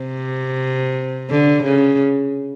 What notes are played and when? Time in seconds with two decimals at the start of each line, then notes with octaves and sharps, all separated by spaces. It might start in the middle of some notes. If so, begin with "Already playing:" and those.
Already playing: C3
1.30 D3
1.64 C#3